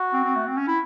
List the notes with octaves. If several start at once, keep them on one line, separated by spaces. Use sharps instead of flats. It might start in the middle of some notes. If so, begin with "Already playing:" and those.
Already playing: F#4
C4
C4
A3
C4
C#4
E4